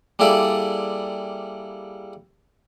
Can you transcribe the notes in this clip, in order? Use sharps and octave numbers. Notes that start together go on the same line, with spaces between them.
G3 A#3 E4 G#4 A4 D5